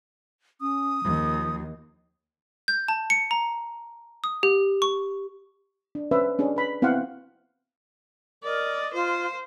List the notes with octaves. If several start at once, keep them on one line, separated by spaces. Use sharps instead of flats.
C#4 D#6
D#2 F3
G6
A5
C#7
A#5
D#6
G4
C#6
D4
C#4 B4 C5 E5
C#4 D4 G#4
B4 B5
B3 C4 E4 C5 F5 F#5
A#4 D5 D#5
F4 C5